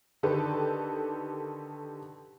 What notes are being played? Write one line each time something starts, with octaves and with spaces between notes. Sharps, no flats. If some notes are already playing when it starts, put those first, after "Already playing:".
D3 D#3 G4 A4 B4